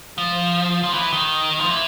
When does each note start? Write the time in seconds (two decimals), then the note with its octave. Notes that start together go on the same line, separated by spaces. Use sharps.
0.18 F3
0.83 F3
0.94 E3
1.13 D#3
1.60 F3
1.70 E3